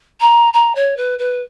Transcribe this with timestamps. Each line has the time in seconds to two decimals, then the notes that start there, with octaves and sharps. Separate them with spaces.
0.20 A#5
0.53 A#5
0.75 C#5
0.97 B4
1.19 B4